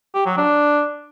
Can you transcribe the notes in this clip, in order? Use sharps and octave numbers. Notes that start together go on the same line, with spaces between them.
G4
F#3
D4